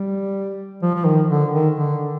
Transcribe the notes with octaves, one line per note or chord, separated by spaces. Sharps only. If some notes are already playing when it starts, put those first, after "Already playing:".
Already playing: G3
F3
F3
D#3
D3
D#3
D3